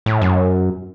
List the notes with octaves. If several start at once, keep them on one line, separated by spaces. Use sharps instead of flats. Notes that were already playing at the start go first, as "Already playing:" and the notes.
A2
F#2